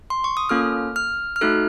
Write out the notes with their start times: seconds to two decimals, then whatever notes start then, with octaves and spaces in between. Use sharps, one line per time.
0.10 C6
0.24 C#6
0.37 D#6
0.49 A#3 C#4 F4 A4 F6
0.96 F6
1.36 F6
1.41 A3 D#4 F#4 A4 F#6